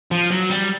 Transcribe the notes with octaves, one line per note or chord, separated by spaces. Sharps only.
F3
F#3
G3